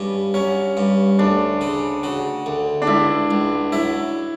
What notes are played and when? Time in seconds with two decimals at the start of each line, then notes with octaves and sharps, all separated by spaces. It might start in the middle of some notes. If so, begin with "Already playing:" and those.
Already playing: G2 B3 C#4
0.34 F#3 C#4
0.77 G2
1.19 D2 D4
1.61 C#3
2.03 C#3 F#4
2.46 D2
2.82 D4
2.87 C#2 E4
3.31 C#2
3.72 F#3 E4